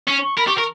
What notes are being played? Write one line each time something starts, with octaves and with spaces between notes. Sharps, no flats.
C#4
C#6
A#4 B5
G4 C#6
A#4 C#6